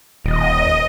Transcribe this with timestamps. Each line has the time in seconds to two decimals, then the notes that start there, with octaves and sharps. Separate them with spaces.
0.24 D#1 D#5